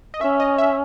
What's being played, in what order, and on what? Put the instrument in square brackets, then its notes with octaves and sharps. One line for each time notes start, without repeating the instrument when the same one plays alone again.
[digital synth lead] D#5
[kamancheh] C#4 [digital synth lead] E5
[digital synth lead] D#5
E5